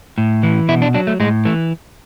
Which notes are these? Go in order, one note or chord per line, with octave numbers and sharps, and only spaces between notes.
A2
E3
B2 E4
D4
F#3 D4
A3
A2 G#3
E3 A3